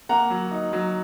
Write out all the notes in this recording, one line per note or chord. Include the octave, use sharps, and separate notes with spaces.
A#3 F#5 A#5
F#3
D#4
F#3